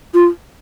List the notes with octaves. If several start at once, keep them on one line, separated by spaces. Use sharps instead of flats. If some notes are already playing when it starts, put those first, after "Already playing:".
F4